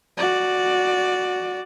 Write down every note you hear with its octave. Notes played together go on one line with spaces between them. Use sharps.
F#4 D5